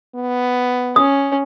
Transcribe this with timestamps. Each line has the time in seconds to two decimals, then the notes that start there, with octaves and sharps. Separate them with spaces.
0.15 B3
0.96 C#4 D#6